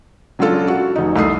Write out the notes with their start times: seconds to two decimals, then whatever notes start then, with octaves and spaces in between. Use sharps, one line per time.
0.39 C#3 F#3 D4 F4 A4
0.68 F#4
0.96 F1 D#4
1.16 C2 A3 D#4 D#6 C7